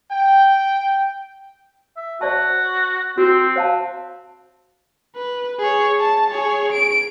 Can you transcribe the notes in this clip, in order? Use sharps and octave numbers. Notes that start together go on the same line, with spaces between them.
G5
E5
F#4 C5 D5 A5
C4 F#4
C5 F5 A5
B4
G#4 C#5
A5
G#4 C#5
D7